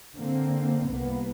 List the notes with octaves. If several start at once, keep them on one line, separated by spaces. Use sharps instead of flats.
D3 A#3 C4
C2 A#3 B3